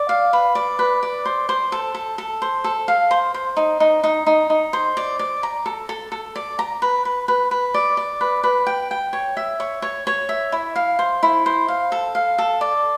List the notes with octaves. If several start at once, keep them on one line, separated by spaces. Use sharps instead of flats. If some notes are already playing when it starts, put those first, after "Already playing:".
Already playing: D5
F5
B4
D5
B4
D5
C5
C5
A4
A4
A4
C5
A4
F5
C5
C5
D#4
D#4
D#4
D#4
D#4
C5
D5
D5
A#5
A4
A4
A4
D5
A#5
B4
B4
B4
B4
D5
D5
B4
B4
G5
G5
C#5
E5
C#5
C#5
C#5
E5
E4
F5
C5
E4
C5
F5
A4
F5
A4
D5